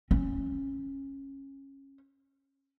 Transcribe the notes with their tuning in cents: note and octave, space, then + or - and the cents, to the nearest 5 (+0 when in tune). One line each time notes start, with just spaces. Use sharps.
C#4 -20